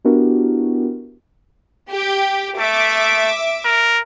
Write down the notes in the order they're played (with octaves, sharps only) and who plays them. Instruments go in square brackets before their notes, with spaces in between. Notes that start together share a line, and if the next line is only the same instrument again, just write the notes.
[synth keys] B3 D4 E4 F#4 G4 A#4
[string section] G4
[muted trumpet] A3 [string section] E5 D6
[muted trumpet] A#4